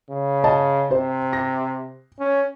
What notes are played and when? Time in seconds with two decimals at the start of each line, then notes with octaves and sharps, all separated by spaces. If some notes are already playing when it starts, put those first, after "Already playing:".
0.10 C#3
0.44 D#5 A5
0.91 C3 C5
1.33 A#6
2.19 C#4